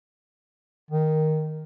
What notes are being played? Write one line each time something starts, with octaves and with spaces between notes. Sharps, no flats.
D#3